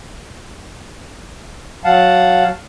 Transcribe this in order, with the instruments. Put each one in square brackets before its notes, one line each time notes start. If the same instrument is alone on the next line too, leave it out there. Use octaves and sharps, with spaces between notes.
[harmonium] F#3 F5 F#5 A5